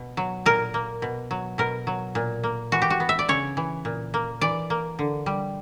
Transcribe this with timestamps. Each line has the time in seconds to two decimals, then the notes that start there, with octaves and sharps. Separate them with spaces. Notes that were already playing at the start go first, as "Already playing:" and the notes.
Already playing: B2
0.17 F#3
0.46 A#2 A#4
0.74 A#3
1.02 B2
1.31 F#3
1.58 B2 A#4
1.87 F#3
2.15 A#2
2.44 A#3
2.72 E3 F#4
2.82 G4
2.90 F#4
3.00 B3
3.09 E5
3.19 D5
3.28 C#3 C#5
3.57 E3
3.85 A#2
4.14 A#3
4.41 E3 D5
4.70 A#3
4.99 D3
5.26 G3